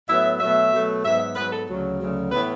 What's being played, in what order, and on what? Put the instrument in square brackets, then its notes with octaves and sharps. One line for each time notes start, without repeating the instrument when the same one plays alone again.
[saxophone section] A2 F#3 B3 E5
B2 F#3 A3 E5
B2 F#3 A3
G#2 F#3 B3 E5
E5
G#2 F#3 B3 B4
A4
D2 C#3 F#3
D2 C#3 F#3
A2 E3 B3 B4